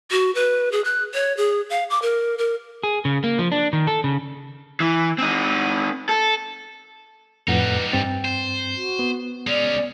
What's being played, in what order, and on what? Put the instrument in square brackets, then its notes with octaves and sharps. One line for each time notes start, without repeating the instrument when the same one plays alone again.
[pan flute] F#4
B4
G#4
F#6
C#5
G#4
F5
D6
A#4
A#4
[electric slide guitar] G#4
C#3
A#3
F3
D4
D#3
A4
C#3
[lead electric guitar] E3
C4 D#4
A4
[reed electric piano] F2 A2 F#5 [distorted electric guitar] G3 D#4 [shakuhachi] B4
[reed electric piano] G2 C4 A6 [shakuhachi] G5
[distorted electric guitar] C5
[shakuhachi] F#4
[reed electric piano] B3
[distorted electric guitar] G#3 C#4 [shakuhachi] D5